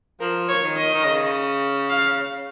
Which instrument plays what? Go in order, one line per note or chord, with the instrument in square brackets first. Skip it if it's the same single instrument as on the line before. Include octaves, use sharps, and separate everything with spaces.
[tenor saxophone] F3 [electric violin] A#4
[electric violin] C#5
[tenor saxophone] D#3
[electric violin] D#5
[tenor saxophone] D#3
C#3
[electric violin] F5